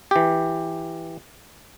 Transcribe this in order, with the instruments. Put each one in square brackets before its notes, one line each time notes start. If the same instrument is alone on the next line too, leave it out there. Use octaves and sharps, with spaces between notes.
[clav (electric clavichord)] E3 G4